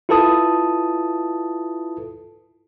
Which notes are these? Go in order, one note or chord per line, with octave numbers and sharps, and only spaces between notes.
E4 F4 A4 B4 A5 D#6